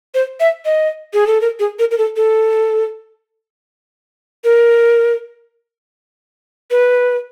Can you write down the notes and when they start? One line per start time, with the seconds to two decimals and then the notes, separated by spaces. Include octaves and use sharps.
0.14 C5
0.40 E5
0.65 D#5
1.14 G#4
1.27 A4
1.41 A#4
1.60 G#4
1.79 A#4
1.91 A#4
1.98 A4
2.16 A4
4.44 A#4
6.71 B4